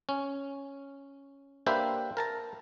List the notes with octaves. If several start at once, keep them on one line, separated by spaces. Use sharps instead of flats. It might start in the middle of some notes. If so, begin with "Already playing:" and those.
C#4
A#3 D4 G4 B4 C5 E5
A#4 A5 A#5